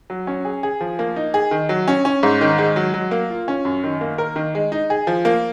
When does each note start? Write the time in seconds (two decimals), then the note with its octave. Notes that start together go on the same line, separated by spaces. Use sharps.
0.10 F#3
0.27 C#4
0.45 G#4
0.63 G#4
0.81 F3
0.99 A#3
1.16 D#4
1.34 G#4
1.51 D#3
1.69 F#3
1.88 C#4
2.05 C#4
2.23 G#2
2.41 D#3
2.58 G#3
2.76 F#3
2.94 F#3
3.11 A#3
3.30 F4
3.48 C#4
3.65 F#2
3.84 D#3
4.01 A#3
4.18 A#4
4.36 D#3
4.55 G#3
4.72 D#4
4.90 G#4
5.07 F3
5.25 A#3